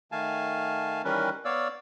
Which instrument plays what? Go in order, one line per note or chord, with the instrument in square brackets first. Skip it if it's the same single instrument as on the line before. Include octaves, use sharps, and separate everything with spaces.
[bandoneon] D#3 A3 F5 G#5 A5
D#3 E3 G3 C#4 A#4 B4
B3 C#5 D5 F5 E6